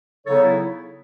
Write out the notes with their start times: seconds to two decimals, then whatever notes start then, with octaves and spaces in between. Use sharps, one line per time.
0.25 C#3 F#3 B3 D#4 A4 C#5
0.41 E4